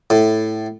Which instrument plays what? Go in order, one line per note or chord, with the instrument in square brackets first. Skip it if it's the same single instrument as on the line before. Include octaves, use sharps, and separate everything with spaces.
[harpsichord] A2